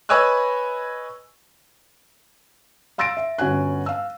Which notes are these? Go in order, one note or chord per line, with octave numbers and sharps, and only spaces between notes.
B4 C#5 D#5 G#5 E6 F#6
F5 C6 E6 A6 A#6 D7
E5
G1 C#4 F#4 G#5 F#6
F5 E6